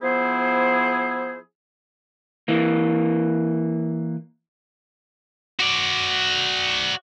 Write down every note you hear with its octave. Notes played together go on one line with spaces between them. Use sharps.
F3 B3 E4 G#4 C5
E3 A#3
F#4 D5